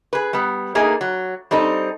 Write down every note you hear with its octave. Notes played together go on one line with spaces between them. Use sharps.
G#4 B4
G3 B3
A3 A#3 D#4 G#4
F#3
G3 C4 D#4 A4